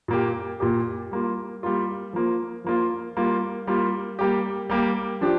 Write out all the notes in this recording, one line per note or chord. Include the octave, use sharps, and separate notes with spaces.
A#2 A#3 G4
A#2 A#3 G4
G3 A#3 F4
G3 A#3 F4
F3 A#3 F4
F3 A#3 F4
G3 A#3 F4
G3 A#3 F4
G3 A#3 G4
G3 A#3 G4
F3 D4 G4